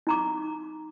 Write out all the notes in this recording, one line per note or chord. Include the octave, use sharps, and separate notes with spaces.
D#4 A#5 D6